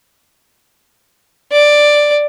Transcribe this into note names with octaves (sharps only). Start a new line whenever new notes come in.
D5